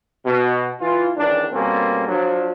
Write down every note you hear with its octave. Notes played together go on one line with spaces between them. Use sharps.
B2
E3 F4
C#2 D#3 E3 D4
B2 G3 A#3 C4 C#4 A4
F3 F#3 D4